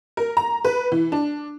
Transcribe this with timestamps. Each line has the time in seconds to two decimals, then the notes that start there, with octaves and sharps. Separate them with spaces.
0.17 A#4
0.37 A#5
0.64 B4
0.92 E3
1.12 D4